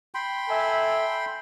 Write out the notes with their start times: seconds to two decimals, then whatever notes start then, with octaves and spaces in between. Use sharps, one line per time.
0.14 G5 B5 C6
0.49 A4 E5 G#5